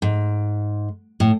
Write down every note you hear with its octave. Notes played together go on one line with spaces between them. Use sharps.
G#2
A2